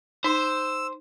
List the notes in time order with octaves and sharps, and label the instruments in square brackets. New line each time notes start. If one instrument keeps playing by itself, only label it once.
[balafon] D#4 [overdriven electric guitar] C5 [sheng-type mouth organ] E6